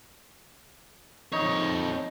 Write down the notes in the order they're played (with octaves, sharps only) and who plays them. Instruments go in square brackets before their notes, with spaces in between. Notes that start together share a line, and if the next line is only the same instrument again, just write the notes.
[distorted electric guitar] F2 C#5 [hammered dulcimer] D#4